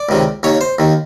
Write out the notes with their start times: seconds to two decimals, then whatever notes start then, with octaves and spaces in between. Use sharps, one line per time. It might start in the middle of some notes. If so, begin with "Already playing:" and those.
Already playing: D5
0.09 C#2 C3 D#3
0.43 D#2 D#3 C#5
0.61 C5
0.79 D#2 D#3